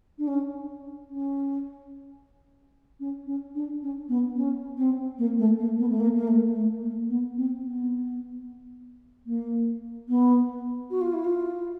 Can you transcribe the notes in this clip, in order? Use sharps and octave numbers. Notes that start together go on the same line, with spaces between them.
D4
C#4
C#4
C#4
C#4
D4
C#4
B3
C#4
C4
A#3
A3
A#3
B3
A3
A#3
A#3
A3
A3
A#3
B3
C4
B3
A#3
B3
F#4
F4
E4
F4